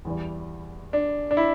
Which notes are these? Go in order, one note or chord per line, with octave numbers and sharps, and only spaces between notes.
E2 E3 G3
D4
D4
E4